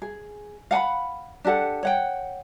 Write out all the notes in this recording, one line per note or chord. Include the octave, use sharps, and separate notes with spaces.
G#4
F5 F#5 G#5 B5
D4 G4 A4 F#5
C#5 F#5 G5